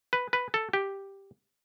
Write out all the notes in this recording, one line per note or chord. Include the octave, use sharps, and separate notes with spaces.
B4
B4
A4
G4